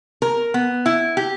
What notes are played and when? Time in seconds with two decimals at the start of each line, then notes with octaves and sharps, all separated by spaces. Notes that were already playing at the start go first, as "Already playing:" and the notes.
0.22 A#4
0.54 B3
0.86 E4
1.17 G4